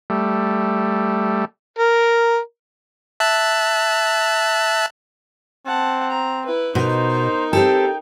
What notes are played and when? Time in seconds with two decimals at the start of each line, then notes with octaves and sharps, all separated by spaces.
0.10 G3 A3
1.79 A#4
3.20 E5 A5 F#6
5.66 C4 F#5 A5
6.10 A#5
6.46 E4 B4
6.75 B2 D#4 A#4 C5
7.53 C4 G4 A4 G5